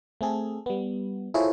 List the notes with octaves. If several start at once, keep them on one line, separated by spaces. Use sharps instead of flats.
A3 C4 G#4 A4
G3 B3
E4 F4 G#4 A4 C5 C#5